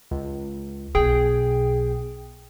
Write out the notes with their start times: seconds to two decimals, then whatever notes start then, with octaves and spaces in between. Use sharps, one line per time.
0.11 C#2
0.95 B1 B2 G#4 G5